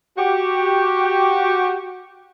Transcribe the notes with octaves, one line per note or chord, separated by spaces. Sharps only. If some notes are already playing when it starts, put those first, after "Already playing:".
F#4 G4